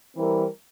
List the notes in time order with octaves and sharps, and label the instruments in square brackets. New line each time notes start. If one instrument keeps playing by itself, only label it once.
[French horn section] E3 G3 C4 E4 A#4